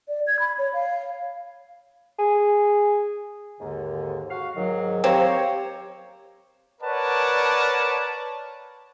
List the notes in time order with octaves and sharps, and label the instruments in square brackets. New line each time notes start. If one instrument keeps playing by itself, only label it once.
[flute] D5
G#6
B5
C#5
F5
[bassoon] G#4
[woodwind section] D#2 G#2 D3
F#4 F5
G#2 D#3 F#3
[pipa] A#3 C4 [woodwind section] G4 C#5
[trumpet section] A#4 B4 C#5 D5 F#5 A5